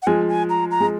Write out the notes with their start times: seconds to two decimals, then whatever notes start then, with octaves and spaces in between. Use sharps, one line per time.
0.02 F#5
0.07 F3 G#3 G#5
0.28 G#5
0.50 A#5
0.71 A#5
0.80 G#3